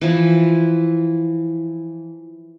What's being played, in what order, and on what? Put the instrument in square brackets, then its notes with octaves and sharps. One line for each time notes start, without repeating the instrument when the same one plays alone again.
[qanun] E3 F3 E4